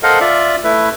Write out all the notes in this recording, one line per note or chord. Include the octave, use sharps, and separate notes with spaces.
A4 A#4 C5 D#5 F5 F#5
F4 D5 E5
A3 E4 B4 E5